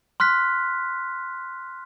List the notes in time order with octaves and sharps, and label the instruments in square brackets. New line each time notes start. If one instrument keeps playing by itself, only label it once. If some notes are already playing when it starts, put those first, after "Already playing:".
[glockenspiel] C6 F6 F#6 B6